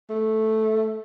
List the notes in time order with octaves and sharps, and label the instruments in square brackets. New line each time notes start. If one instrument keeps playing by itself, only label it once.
[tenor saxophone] A3